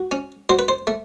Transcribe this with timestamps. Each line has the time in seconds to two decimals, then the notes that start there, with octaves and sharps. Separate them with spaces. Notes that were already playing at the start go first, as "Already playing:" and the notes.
Already playing: F#4
0.11 C#4
0.49 F#3 C5
0.59 B4
0.68 C5
0.87 A3